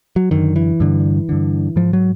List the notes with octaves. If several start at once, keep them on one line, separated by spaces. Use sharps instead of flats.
F#3
F#2 D3 D#3
E3
G2 D3
G2 D3
G#2 F3
F#3